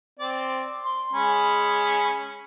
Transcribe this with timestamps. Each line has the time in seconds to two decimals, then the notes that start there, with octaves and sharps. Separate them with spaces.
0.19 C4 D5
0.84 C6
1.13 G#3 C#4 B5